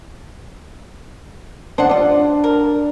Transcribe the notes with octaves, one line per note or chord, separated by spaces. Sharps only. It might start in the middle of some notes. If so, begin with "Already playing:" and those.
D4 C5 D#5 F#5
G3 F4
A#4